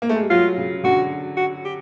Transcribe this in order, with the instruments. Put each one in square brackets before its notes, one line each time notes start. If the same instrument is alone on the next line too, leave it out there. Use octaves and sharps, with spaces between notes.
[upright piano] A#3
A3
G#3
G3
[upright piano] F#3 [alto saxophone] F4
[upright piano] C#3
[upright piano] D3 [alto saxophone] F#4
[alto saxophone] F#4
G4